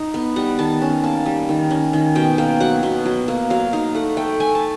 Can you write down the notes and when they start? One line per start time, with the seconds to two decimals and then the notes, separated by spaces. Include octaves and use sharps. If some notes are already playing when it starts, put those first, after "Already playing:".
Already playing: D#4
0.14 B3
0.36 G3 F#5
0.59 D#3 A5
0.82 C#4
1.04 A#3 A5
1.26 G3
1.49 D#3
1.71 C#4
1.93 D#3
2.15 B2 G5
2.38 A#3 G5
2.60 F#3 F#5
2.83 B2
3.06 F#3
3.28 A#3
3.50 F#3 F5
3.73 D#4 F5
3.95 A3 F#5
4.17 A3 G5
4.40 A3 G#5
4.55 A5